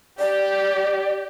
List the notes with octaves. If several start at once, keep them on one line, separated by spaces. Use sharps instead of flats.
G4 D5